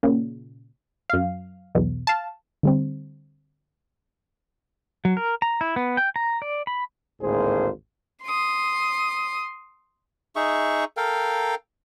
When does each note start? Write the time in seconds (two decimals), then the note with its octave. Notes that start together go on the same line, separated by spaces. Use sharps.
0.03 A#2 C#3
1.10 F#2 F5
1.75 B1 E2 B2
2.07 F5 A5
2.63 D3 G3 C4
5.05 F#3
5.17 A#4
5.42 A#5
5.61 E4
5.76 B3
5.97 G5
6.16 A#5
6.42 D5
6.67 B5
7.22 G#1 D2 A2 A#3 G#4 C5
8.23 C6 D#6
10.36 D#4 G#4 E5 C#6
10.97 A4 A#4 F5 G5